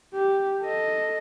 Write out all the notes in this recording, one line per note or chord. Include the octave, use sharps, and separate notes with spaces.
G4
A4 D#5